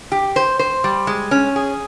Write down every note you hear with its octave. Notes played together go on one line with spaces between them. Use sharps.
G4
C5
C5
G3
G#3
C#4
G#4